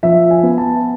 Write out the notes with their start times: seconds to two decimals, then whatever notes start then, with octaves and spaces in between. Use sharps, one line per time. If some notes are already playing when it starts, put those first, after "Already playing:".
0.03 F3 E5
0.31 G#5
0.43 B3
0.58 A5